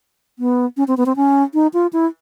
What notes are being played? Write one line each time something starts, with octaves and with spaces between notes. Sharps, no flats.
B3
C#4
C4
B3
C4
C#4
D#4
F4
E4